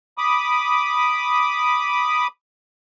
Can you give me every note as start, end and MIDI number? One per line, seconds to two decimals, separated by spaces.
0.18 2.27 83
0.18 2.27 86
0.18 2.27 87